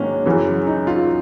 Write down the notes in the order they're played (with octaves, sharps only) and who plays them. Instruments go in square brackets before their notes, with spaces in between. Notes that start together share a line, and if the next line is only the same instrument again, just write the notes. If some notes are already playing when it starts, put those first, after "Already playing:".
Already playing: [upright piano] G#2 D#3 F#3 A#3 [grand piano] C#4 D4
[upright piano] F#2 C#3 E3
[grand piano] D#4
F4